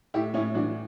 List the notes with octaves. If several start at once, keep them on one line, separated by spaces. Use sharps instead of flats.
A2 E4 G4
A2 C#4 E4
E3 D4 F#4